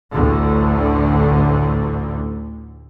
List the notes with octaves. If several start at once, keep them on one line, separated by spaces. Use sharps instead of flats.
A1 D2 A2 D3